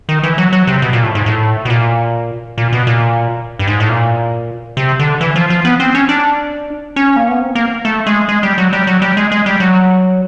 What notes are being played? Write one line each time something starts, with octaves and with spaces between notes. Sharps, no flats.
D#3
E3
F#3
F#3
C3
B2
A#2
A2
G#2
A2
B2
A#2
A#2
B2
A#2
G2
G#2
A2
A#2
C3
D3
E3
F3
F3
B3
C4
C#4
D4
C#4
A#3
B3
C4
A#3
A3
G#3
G#3
G3
F#3
G3
F#3
G3
G#3
G#3
G3
F#3